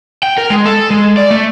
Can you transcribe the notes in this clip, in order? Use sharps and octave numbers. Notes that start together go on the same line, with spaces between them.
G5
A#4
G#3
A4
G#3
D5
A3